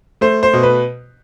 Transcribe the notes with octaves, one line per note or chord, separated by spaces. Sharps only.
A3 C5
C5
B2
B4